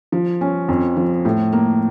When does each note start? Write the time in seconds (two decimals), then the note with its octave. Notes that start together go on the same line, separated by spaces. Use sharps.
0.12 F3
0.41 C#4
0.69 F2
0.97 F3
1.25 A2
1.52 A#3